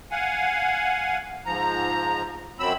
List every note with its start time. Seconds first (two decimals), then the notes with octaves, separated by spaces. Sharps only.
0.11 F5 F#5 G#5
1.46 G#2 F3 A#5
2.59 F#2 F#3 C4 B5 E6